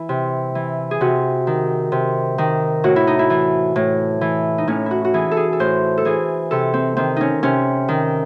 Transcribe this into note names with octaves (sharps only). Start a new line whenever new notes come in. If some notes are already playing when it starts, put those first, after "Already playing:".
Already playing: E3 E4
C3
E3
G#4
C3 F#4
D#3
C3
D#3
A2 F#4
E4
D#4
E4
E3
A2
E3
D#4
A2 C#4
E4 F#4
F#4
E3 G#4
A4
G#4
A4
A2 C5
A4
E3 G#4
C3 A4
C4
D#3 C4
C#4 D#4
C3 C#4
D#3